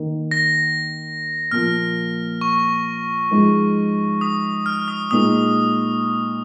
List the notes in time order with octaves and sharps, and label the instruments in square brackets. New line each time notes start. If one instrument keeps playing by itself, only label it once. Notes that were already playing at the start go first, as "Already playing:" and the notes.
Already playing: [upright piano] D#3 A#3 D#4
[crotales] A#6
[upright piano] A#2 F3 A#3 [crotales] F6
[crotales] C#6
[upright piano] G#2 F3 G#3 D#4
[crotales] D#6
F6
D#6
[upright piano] A#2 G#3 D#4 [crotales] D#6